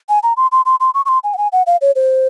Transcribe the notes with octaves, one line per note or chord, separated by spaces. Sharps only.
G#5
A#5
C6
C6
C6
C6
C#6
C#6
C6
G#5
F#5
G#5
F#5
F5
C#5
C5